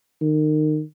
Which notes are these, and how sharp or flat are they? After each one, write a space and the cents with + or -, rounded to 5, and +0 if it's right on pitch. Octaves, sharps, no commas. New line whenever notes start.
D#3 -25